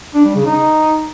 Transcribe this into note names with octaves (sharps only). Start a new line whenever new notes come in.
D4
G3
C#3
D#4